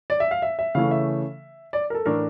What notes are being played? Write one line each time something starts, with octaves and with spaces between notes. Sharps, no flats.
D5
E5
F5
E5
E5
C#3 E3 A3 C#4 F5
E5
D5
A#4
A4
A2 E3 A3 D4 A#4